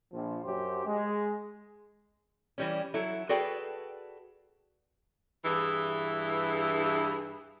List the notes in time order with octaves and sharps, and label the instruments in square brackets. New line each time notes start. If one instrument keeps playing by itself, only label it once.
[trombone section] A#1 F3
F#2 F#3 G4 C5
G#3
[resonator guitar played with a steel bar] E3 G3 C#4
F#3 E4 A4
F#4 G#4 A4 B4 D5 G5
[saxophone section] G2 E3 E4 G#4